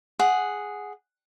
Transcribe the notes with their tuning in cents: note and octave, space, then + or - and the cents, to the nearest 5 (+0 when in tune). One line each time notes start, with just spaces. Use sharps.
G#4 +0 F#5 +0